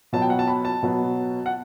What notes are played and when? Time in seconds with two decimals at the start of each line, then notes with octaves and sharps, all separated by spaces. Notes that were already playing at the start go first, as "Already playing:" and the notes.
0.13 B2 F#3 B3 A5
0.22 G5
0.30 F#5
0.39 A5
0.47 B5
0.65 A5
0.83 B2 F#3 B3
1.46 F#5